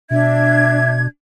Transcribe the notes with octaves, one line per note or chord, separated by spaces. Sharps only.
B2 D4 E5 G#6